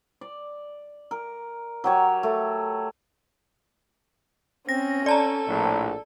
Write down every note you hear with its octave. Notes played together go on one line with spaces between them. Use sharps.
D5
A#4
F#3 G4 C#5
A3
C4 C#4 A#6
A4 D5 A5 A#5
A#1 A2